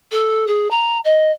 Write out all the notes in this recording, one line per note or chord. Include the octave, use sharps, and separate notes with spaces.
A4
G#4
A#5
D#5